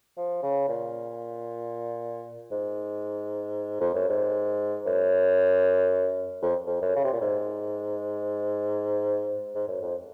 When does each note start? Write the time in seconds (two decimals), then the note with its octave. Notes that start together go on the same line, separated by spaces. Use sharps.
0.17 F3
0.43 C#3
0.68 A#2
2.51 G#2
3.80 F2
3.94 F#2
4.09 G#2
4.86 F#2
6.42 F2
6.67 F2
6.82 F#2
6.96 C#3
7.04 C3
7.12 A#2
7.21 G#2
9.55 G#2
9.68 F#2
9.82 F2